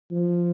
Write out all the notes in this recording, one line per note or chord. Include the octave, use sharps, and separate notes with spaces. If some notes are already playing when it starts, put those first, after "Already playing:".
F3